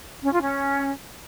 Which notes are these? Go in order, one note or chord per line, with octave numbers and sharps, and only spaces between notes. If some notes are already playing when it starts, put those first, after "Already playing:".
C#4
F4
C#4